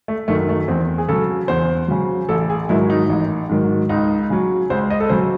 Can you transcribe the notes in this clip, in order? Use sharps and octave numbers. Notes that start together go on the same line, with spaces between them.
A3
F#2 D#3 A3
A3
E2 C4
G#4
C#3 F#3 A4
E2 C5
C#3 F#3
A1 A4
G#4
G#2 D#3 F#3 E4
D#4
A1
G#2 D#3 F#3
C#2 D#4
C#3 F#3
C#2 C5
D#5
A4
C#3 F#3 C5